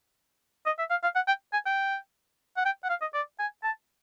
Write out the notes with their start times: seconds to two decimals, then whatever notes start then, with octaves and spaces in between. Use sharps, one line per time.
0.66 D#5
0.79 E5
0.90 F5
1.03 F5
1.15 F#5
1.28 G5
1.53 G#5
1.66 G5
2.57 F#5
2.65 G5
2.84 F#5
2.89 F5
3.01 D#5
3.14 D5
3.39 G#5
3.63 A5